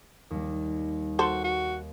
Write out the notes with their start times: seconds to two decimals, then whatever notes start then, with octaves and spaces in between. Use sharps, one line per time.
0.31 D#2 G3
1.19 F#4 A4 C5
1.44 F#4